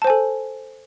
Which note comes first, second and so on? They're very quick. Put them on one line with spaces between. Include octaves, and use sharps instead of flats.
A5 C5 G#5 A4